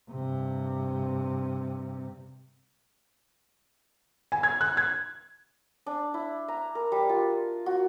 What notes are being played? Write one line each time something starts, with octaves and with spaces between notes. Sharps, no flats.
G2 C3
G#5
G#6
F#6
G#6
D4
E4
A#5
A#4
G3
F4
F#4